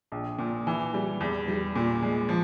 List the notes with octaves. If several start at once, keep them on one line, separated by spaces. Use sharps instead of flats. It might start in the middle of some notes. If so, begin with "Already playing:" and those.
A#1
A#2
E3
G3
E2
G3
A#2
G#3
F3